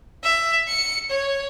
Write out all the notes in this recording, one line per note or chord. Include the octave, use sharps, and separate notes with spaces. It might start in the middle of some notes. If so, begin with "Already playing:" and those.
E5
C#7
C#5